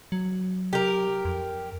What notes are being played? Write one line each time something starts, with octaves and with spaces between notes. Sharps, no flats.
F#3
G4 A#4
F2